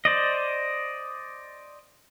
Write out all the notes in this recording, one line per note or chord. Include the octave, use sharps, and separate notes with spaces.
C5 D5 D#5